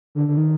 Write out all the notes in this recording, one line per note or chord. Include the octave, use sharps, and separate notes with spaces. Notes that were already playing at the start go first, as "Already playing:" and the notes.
D3
D3
D#3